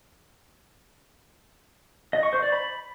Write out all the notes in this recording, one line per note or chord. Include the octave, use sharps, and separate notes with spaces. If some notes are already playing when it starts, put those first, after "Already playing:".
D#5
C#6
C5
D5
B5